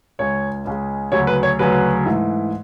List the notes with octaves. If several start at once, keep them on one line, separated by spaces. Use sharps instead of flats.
C#2 C#3 G#3 C#5
C#2 C#3 G#3
D2 C#3 F#3 C#5
B4
C#5
D2 C#3 F#3 B4
G#2 E3 A3